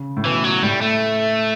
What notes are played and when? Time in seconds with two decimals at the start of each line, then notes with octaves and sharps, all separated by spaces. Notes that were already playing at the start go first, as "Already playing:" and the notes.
Already playing: C#3
0.17 A2
0.25 B2 E3
0.44 F#3
0.63 A2 G3
0.81 A3